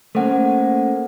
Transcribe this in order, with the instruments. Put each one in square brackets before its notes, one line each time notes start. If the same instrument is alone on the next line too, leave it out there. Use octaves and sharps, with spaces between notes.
[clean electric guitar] A3 A#3 C#4 [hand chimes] A4 C5 F#5